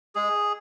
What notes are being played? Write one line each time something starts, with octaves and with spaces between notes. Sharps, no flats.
G#3 G#4